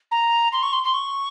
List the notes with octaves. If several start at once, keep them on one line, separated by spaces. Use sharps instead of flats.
A#5
C6
C#6
C6
C6
C#6